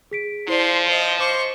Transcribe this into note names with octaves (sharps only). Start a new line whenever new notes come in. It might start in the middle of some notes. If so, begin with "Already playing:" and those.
G#4 B6 D7
F3 E4 C5 D5 C6
C5 D#5 F7
C5 C#6 D6 E7